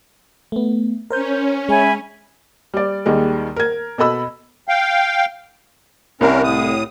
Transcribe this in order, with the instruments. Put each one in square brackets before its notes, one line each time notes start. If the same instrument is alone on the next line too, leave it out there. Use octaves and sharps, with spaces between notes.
[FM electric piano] A3 B3
[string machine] C#4 [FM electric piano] A#4 C5 G6
[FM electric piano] G#3 [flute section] E5 G#5 B5
[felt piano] G3 D5
D#2 D#3 G3 G#3
A#4 G#6
B2 A4 D#5 B5 E6
[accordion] F5 G5
[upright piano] C2 [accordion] C#4 A#4
[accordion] A2 D#6